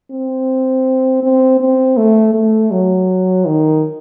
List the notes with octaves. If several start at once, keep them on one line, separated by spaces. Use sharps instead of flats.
C4
C4
C4
A3
A3
F#3
D#3